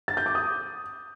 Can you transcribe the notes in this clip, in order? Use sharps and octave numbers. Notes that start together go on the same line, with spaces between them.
A6
G6
D6
D#6